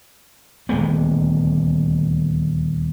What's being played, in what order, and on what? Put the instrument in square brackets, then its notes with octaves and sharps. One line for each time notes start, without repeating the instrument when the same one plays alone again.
[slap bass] D#1 D2 G#3 B3